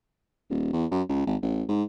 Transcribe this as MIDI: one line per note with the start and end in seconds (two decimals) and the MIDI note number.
0.50 0.70 27
0.73 0.86 40
0.91 1.02 42
1.09 1.23 37
1.26 1.36 32
1.42 1.63 33
1.69 1.83 44